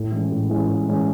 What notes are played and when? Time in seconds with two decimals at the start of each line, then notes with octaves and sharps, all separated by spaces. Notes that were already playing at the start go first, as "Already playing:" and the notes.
Already playing: A2
0.12 E3 G#3 C#4
0.32 A2
0.50 E3 G#3 C#4
0.68 A2
0.88 E3 G#3 C#4